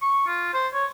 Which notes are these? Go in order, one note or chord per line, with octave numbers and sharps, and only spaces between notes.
C#6
F4
C5
C#5